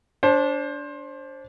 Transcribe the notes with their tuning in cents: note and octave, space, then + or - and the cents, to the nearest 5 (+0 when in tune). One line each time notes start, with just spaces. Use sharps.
D4 -20 C5 +25